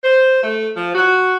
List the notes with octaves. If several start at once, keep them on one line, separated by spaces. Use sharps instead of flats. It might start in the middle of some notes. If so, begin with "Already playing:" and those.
C5
A3
F3
F#4